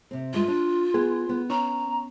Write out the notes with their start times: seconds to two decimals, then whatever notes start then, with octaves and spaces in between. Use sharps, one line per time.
0.11 C3 C4
0.33 G2 G#3 F4 E5
0.48 D4
0.94 B3 G#4
1.29 B3
1.50 C#4 A#5